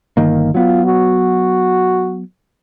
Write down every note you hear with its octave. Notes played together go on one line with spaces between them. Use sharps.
G1 D#3 A#3
F#3 B3 F4
F#4